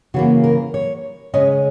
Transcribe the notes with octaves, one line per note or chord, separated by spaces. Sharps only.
C#3 E3 A#3 F#4
A#4
C#5
C#3 G#3 C#4 D#5